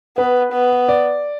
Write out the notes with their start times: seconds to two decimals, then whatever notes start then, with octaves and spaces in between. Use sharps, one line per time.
0.17 B3 B4
0.53 B3
0.89 D5